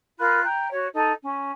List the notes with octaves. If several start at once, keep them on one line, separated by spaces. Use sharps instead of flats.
F4 A#4 B5 F#6
G5 A#5
F#4 C#5
D#4 A4
C#4